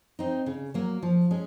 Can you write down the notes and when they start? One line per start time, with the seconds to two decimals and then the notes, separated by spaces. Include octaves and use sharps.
0.19 C4 D#4
0.46 C#3
0.74 F#3 A#3
1.02 F3
1.31 G#3 C#4